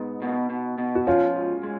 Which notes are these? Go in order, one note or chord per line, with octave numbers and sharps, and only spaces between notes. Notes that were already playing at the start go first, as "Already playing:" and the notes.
Already playing: G#2 B3 D#4
B2
B2
B2
F#4
F3 C#4 F4
G#2
G#3